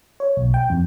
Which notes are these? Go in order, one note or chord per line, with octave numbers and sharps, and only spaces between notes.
C#5
B1
G5
F2